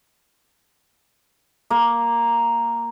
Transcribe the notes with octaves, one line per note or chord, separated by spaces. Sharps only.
A#3